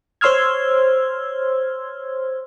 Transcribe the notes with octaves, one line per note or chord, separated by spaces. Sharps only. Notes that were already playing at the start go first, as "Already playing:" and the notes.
C5 C#5 C6 E6 F6 G#6